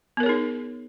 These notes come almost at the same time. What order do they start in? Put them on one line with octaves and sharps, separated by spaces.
B3 A#4 C#5 G#4 D#4